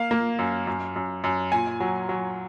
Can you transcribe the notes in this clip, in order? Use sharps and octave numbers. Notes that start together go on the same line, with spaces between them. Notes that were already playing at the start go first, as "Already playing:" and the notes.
Already playing: A#3 F5
A#3
F#2
F#2
F#2
F#2
A#2 G#5
F#3
F#3